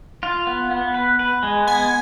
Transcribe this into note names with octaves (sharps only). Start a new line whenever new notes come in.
F4
B3
B3
B4
B4
G#3
B3 G#5